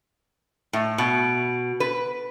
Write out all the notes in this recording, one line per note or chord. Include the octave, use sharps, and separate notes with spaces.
A2
B2
B4